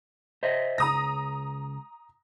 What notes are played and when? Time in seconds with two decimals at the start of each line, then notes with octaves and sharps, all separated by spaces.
0.43 C5 D#5 E5
0.78 C#2 A#5 D#6 A#6